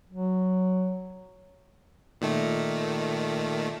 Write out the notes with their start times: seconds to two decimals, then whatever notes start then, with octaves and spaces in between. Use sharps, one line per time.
0.10 F#3
2.21 A#2 D#3 A3